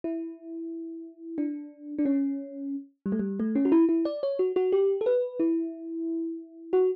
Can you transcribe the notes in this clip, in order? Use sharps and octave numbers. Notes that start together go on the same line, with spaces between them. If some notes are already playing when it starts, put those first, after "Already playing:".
E4
D4
D4
C#4
G3
A3
G3
A3
C#4
F#4
E4
E4
D5
C#5
F#4
F#4
G4
A4
B4
E4
F#4